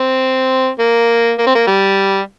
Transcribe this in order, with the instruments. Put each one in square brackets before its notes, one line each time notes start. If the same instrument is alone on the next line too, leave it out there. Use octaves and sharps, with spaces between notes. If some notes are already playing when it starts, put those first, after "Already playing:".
Already playing: [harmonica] C4
A#3
A#3
C4
A#3
G3